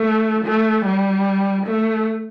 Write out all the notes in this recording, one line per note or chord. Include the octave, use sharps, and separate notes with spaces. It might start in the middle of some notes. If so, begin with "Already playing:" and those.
Already playing: A3
A3
G3
A3